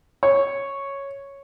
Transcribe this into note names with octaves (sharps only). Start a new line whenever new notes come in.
C#5